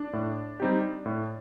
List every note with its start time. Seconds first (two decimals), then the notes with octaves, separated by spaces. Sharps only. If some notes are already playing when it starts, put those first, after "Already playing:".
Already playing: D4
0.13 A2
0.60 G3 C4 D#4 G4
1.06 A2